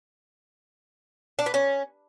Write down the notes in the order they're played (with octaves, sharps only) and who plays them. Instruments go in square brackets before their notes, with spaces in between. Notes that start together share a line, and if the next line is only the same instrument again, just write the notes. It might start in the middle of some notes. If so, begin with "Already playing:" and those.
[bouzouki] D4
B3
C#4